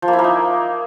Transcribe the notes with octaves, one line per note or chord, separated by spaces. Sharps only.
F3
A#3
E4
A#3
D#4